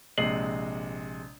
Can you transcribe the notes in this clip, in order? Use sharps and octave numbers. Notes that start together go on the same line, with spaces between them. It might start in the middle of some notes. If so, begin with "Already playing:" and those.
A#1 C3 G#3 D#5 C7 F#7